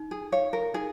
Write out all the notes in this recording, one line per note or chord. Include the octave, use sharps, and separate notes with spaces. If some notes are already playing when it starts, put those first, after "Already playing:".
Already playing: D#4
G#4
C#5 F5
A#4
D#4 G#4